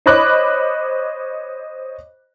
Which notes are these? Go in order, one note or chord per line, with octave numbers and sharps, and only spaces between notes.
C5 C#5 D#5 B5 D6 F#6